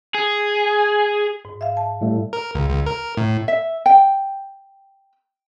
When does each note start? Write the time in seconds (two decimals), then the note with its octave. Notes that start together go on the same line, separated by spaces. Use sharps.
0.14 G#4
1.45 G#2
1.61 E5 F5
1.77 A5
2.01 A2 G3 A3
2.33 A#4
2.55 C#2
2.70 C#2
2.86 A#4
3.17 A2
3.48 E5
3.86 G5